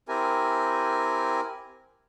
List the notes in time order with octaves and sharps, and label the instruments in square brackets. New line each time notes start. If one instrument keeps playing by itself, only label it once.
[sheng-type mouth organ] C4 E4 G4 A#4 G#5